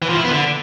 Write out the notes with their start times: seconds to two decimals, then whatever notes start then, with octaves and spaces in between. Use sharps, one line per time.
0.02 E3
0.09 F3
0.17 E4
0.24 B3
0.31 D3